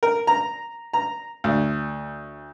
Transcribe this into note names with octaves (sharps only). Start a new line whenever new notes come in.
A#4
A#5
A#5
D2